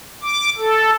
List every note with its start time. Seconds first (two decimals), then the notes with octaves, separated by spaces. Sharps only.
0.22 D6
0.58 A4